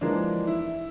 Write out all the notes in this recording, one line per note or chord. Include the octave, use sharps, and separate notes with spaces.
E3 F3 G#3 A#3 D4
E4